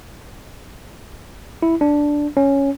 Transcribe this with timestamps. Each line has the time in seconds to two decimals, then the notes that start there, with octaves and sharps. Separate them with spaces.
1.63 E4
1.81 D4
2.37 C#4